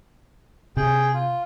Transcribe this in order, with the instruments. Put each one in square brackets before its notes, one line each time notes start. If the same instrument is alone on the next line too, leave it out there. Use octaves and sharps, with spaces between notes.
[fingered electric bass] C3 [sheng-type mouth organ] G#4 G5
[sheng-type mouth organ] F4